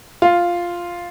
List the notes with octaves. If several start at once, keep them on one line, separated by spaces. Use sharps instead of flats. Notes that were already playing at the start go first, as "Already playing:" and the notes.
F4